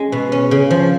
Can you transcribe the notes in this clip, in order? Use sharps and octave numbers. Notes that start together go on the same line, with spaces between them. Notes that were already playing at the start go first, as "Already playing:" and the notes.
Already playing: G#3 C#4
B2
C#4
C#3
F3